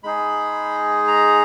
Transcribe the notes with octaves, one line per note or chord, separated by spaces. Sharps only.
G#3 D#4 G#4 B5
A#5